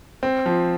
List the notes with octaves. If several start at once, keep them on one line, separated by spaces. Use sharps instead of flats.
C4
F3